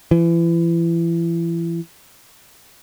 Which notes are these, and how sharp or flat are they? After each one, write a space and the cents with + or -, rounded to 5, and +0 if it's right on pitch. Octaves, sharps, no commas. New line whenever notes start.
E3 +30